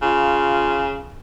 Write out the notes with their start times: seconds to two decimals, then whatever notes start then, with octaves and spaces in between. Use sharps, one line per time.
0.02 C#3 F4